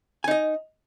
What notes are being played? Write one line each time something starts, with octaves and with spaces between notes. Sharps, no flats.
D#4 D#5 G#5